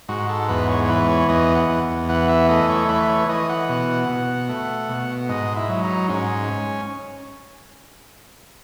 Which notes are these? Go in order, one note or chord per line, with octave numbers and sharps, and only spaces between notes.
G#2 F#4
A4
E2 B4
C#5
C#5
E3 B4
C#5
E2 D#5
F#5
E2
E3 F#5
E5
A3 D#5
C#5
E3 B4
C#5
E3 D#5
F#5
B2
B2
A3
B2
G#2 D#5
E4
F#3
D#4
G#2 C#4